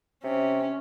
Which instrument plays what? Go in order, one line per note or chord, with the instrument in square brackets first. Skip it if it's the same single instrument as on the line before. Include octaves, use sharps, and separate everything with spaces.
[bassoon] C3 [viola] C#4